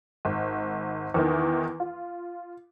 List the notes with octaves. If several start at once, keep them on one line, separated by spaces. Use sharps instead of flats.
G#1
E2 D#3 E3
F4